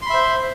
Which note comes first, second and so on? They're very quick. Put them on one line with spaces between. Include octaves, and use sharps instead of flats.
C6 B5 E5 C5